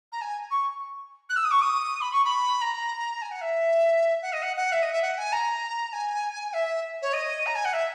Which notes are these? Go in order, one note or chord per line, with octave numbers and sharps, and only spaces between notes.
A#5
G#5
C#6
F#6
E6
D#6
C#6
D#6
B5
C#6
B5
A#5
G#5
F#5
E5
F#5
D#5
F#5
F#5
E5
D#5
E5
F#5
G#5
A#5
G#5
E5
C#5
D#5
A#5
G#5
F#5
E5